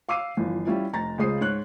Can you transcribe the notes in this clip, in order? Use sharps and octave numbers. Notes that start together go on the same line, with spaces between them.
F5 D6 E6 C7 D#7
G1 E3 F3
G3 C#4 E4 F4
F1 A#5 A6 A#6
C#2 C#3 G#3 C5 D#6 C7
G#2 C#5 F#6